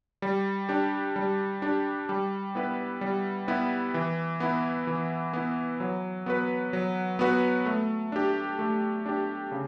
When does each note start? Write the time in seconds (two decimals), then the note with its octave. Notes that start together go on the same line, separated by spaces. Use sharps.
0.22 G3
0.69 D4 G4
1.16 G3
1.62 D4 G4
2.09 G3
2.55 B3 E4 B4
3.01 G3
3.48 B3 E4 B4
3.94 E3
4.40 B3 E4
4.87 E3
5.33 B3 E4
5.80 F#3
6.26 B3 F#4 B4
6.73 F#3
7.19 B3 F#4 B4
7.66 A3
8.12 D4 G4
8.59 A3
9.06 D4 G4
9.52 C#3